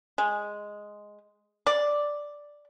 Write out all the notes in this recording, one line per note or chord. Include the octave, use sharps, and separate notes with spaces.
G#3
D5